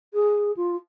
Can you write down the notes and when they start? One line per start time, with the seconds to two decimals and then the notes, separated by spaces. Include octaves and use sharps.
0.14 G#4
0.56 F4